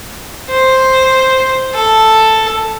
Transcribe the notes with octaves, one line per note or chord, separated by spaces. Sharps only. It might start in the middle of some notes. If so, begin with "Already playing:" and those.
C5
A4